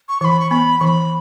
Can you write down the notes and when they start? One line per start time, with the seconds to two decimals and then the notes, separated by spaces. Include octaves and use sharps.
0.09 C#6
0.21 E3 B5 C#6
0.40 C#6
0.51 B3 B5
0.80 E3 B5 C#6